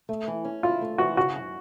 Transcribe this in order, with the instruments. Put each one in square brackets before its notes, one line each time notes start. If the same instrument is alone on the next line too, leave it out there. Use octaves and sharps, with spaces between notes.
[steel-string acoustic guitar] A3
E3
C#4
[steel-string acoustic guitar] E4 [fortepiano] F4
[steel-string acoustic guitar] A3
[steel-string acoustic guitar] E3 [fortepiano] F#4
[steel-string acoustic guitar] C#3 [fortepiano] F#4
[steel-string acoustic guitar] F#2